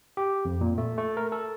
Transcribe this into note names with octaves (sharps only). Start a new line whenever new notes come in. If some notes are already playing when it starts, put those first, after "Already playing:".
G4
F2
A#2
A3
A3
A#4
A4